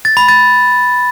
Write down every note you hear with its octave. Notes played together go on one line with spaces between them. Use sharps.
A6
B5
A6